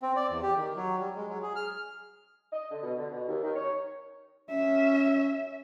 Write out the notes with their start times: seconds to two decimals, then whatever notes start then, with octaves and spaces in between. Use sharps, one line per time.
0.02 C4
0.16 D5
0.29 E2
0.42 G4
0.57 D#3
0.76 F#3
0.99 G3
1.16 G#3
1.29 F#3
1.43 G#4
1.56 F6
2.52 D#5
2.70 D3
2.82 B2
2.97 D3
3.10 B2
3.27 D#2
3.43 D#3
3.55 C#5
4.50 C#4 E5